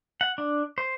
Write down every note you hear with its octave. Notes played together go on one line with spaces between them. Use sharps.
F#5
D4
C5